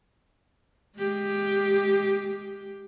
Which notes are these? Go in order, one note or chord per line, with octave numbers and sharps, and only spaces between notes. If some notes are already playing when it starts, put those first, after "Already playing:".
G#3 G4